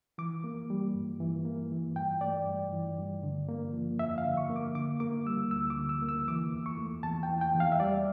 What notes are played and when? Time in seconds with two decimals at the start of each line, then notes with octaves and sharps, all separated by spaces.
0.18 E3 D6
0.44 A#3
0.70 G3
0.95 G2
1.20 E3
1.45 A#3
1.72 E3
1.96 G2 G5
2.21 A3 D5
2.46 G2
2.73 E3
2.98 G2
3.23 D3
3.49 A#3
3.73 F3
3.99 F2 E5
4.18 F5
4.24 D3
4.37 C#6
4.50 A#3
4.56 D6
4.75 D3 D6
5.00 A#3 D6
5.26 G3 E6
5.51 D2 E6
5.70 D6
5.77 D3
5.89 E6
6.02 A#3
6.09 E6
6.28 E3 D6
6.53 E2
6.66 C#6
6.78 A3
7.03 E2 A5
7.23 G5
7.29 E3
7.41 G5
7.55 E2
7.60 F5
7.72 E5
7.80 G3 D5